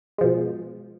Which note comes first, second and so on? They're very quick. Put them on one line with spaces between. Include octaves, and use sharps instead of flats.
G#3 F3 B2